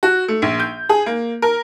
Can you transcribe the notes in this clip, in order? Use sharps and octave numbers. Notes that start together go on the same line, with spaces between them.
F#4
A3
A#1
G6
G#4
A#3
A#4